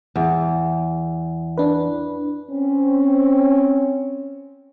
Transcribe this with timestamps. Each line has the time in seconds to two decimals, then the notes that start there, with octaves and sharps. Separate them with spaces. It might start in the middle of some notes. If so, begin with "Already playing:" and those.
0.16 E2
1.57 D4 B4
2.51 C4 C#4